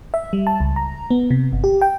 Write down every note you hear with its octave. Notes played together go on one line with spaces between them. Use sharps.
E5
G3
A5
C#2
A#5
B3
C3
G1
G4
G5